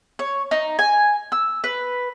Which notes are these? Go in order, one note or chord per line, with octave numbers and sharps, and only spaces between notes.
C#5
D#4
G#5
E6
B4